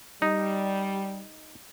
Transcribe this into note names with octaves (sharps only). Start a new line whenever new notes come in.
G3 D#4